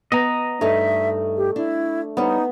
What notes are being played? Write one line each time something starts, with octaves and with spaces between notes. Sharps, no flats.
B3 D#5 A#5
G2 A3 D#4 E5
G4
D4 E4
G3 B3 C#4 D#4